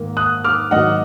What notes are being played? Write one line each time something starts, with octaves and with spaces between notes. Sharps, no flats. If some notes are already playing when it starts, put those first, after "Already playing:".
Already playing: G#2 D#3 A#3
D#6 F#6
D6 F6
G#2 D#3 F#3 A#3 D#5 F#5